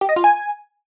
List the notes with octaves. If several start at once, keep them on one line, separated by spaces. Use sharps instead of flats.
G4
D#5
F4
G#5